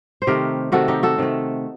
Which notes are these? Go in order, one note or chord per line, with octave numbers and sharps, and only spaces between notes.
C5
C3 D#3 A3 G4 A#4
C3 D#3 A3 F#4 A4
D#4 G4
F#4 A4
C3 D#3 A3